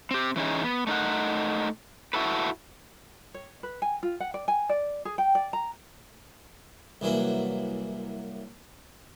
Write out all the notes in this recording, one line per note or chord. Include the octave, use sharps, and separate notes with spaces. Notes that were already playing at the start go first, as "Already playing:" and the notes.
C4 G4
E3 C#4 D#4 G#4
B3
A3 D#4 A#4 F#5
E4 F#4 A4 B4
C#5
B4
G#5
F4
F#5
D5
G#5
D5
G#4
G5
D5
A#5
C2 E3 F#3 A#3